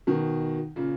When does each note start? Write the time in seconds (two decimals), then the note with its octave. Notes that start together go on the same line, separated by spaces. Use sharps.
0.07 B2 D#3
0.76 A#2 C#3